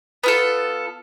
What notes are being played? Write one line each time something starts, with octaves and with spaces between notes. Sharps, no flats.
B3 F4 A4